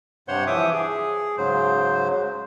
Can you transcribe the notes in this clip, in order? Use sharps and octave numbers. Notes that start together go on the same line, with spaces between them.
G2 C3 C5 C#5 F#5 C6
E3 F3 E5 D6 D#6
G#4
G#2 C#3 F#3 C5